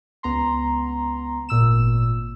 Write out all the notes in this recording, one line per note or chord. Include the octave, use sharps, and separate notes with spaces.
C#2 B3 A#5 C6
G#1 A#2 E6 E7